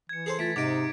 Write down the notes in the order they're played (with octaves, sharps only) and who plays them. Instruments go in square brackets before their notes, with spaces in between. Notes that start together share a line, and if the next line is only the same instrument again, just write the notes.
[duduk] E3 [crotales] G#6 C#7
[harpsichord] G#4 A4 C5
[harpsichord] A3 [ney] F4 [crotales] A6 B6 D7
[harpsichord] G#2 D#5 [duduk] C3 [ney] D#4 [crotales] D6 D7